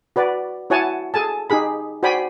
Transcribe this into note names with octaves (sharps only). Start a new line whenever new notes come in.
F#4 B4 D5
E4 F#4 C#5 F#5 G#5 A5
G#4 A4 G#5 A5
D#4 G4 G#4 B5
F#4 C5 D5 G5 G#5 B5